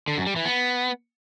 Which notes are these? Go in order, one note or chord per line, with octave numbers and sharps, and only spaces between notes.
D3
F#2
G3
E3
B3